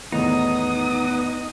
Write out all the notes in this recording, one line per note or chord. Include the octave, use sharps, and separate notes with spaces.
E2 A2 D#3 B3 D#4 D#6